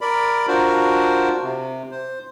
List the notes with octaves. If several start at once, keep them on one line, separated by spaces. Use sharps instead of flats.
A#4 D5 B5
D4 F4 F#4 A#4 C5
C3
C5